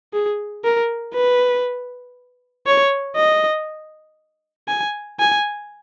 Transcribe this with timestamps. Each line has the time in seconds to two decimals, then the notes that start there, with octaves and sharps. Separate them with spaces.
0.13 G#4
0.64 A#4
1.14 B4
2.66 C#5
3.17 D#5
4.68 G#5
5.20 G#5